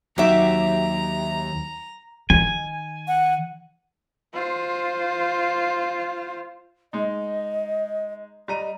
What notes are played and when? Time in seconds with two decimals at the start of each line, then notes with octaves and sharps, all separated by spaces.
0.18 D#2 F#3 D#4 G4 E5 A#5
2.30 D#3 G#5
3.08 F#5
4.33 F4 C5
6.93 G#3 D#4 D#5
8.48 G3 D#5 A#5 D#7